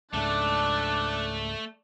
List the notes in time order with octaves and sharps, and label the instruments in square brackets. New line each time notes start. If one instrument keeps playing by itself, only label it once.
[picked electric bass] C#2 G#2 [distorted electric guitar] A3 A4 [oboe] D4 [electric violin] D5 F#6